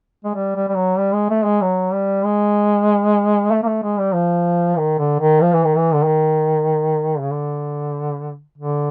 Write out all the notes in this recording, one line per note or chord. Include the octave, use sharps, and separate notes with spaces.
G#3
G3
G3
G3
F#3
G3
G#3
A3
G#3
F#3
G3
G#3
A3
A#3
A3
G#3
G3
F3
D#3
D3
D#3
F3
E3
D#3
E3
D3
D#3
C#3
D3
D3